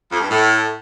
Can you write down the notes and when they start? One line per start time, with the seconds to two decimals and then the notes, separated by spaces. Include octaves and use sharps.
0.12 F2
0.21 G2
0.29 A2